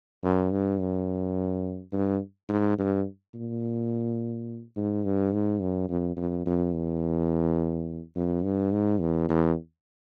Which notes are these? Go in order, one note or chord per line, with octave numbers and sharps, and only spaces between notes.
F#2
G2
F#2
G2
G#2
G2
A#2
G#2
G2
G#2
F#2
F2
F2
F2
E2
F2
G2
G#2
E2
E2